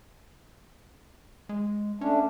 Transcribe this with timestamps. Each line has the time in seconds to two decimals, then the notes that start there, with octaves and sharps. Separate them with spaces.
1.49 G#3
2.01 A3 C#4 D4